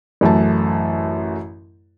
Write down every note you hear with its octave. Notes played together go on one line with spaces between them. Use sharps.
A1 F#2 A3 A5